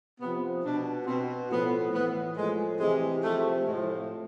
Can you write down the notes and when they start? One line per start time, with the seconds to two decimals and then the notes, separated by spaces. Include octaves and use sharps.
0.21 C3 F3 B3
0.64 B2 D4
1.07 B2 C4
1.51 A2 F3 B3
1.93 A2 E3 B3
2.36 A2 F3 G#3
2.80 C3 E3 G#3
3.22 C3 F3 A3
3.66 A2 F3 G#3